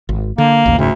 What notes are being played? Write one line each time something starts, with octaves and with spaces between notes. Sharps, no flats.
G#1
D3 A#3
A1 D#2 C#3
F1 D2 G#2 C#3